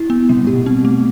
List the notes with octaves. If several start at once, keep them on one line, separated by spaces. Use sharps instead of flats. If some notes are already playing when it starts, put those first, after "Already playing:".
Already playing: E4
B3
C3 G3
B2
A2 G4
B2
C4
A3